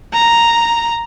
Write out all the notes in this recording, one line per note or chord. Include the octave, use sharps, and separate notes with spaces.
A#5